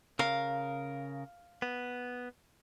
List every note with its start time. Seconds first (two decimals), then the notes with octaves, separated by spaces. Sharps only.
0.19 C#3 A#4 F5
1.62 B3